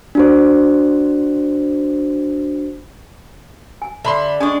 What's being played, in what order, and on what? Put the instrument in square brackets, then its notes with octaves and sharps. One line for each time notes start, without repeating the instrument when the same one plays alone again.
[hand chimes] D4 F#4 C5
[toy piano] G#5
[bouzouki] D3 [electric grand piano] E5 B5 C6
[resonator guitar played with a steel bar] G#3 D4 [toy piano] C#4 C#6 [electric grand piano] G#5